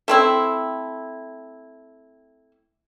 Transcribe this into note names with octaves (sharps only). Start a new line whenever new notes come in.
A3 C4 E4